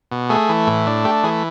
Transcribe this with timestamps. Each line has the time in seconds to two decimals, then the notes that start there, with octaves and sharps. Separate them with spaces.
0.11 B2
0.30 A3 G#4
0.49 E3
0.67 A2
0.87 D4
1.05 A3 G4
1.24 E3 G#4